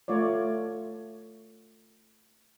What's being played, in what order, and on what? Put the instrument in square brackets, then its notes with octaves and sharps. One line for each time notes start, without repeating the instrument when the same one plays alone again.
[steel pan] A3 F4 C#5 D5